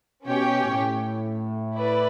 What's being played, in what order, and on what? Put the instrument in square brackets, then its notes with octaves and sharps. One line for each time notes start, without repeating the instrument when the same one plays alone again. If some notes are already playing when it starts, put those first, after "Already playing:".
[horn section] B2 [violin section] C#4 G4 C#5 G5
[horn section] A2
[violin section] E4 B4 D5